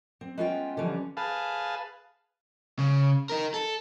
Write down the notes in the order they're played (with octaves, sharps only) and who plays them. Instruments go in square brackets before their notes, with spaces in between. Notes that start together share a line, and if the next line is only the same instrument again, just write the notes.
[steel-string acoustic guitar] C4
G#3 B3 C#4 F4 F5 G5
D3 E3 F3 G3 B3 C#4
[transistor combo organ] G#4 B4 F5 A5
[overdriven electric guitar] C#3
D#4 A#4
A4